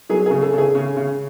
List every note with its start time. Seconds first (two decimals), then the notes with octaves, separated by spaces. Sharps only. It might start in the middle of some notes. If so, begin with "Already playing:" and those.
0.09 F#3 G#4
0.26 C#3 G#4
0.42 A4
0.53 C#3 G#4
0.75 C#3
0.97 C#3